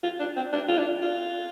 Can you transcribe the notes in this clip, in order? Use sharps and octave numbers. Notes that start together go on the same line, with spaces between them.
F4
D4
C4
D4
F4
D4
F4